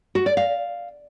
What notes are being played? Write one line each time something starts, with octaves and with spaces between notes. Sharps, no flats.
F#4
D5
F5